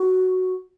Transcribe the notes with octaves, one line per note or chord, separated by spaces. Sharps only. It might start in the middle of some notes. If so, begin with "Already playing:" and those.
Already playing: F#4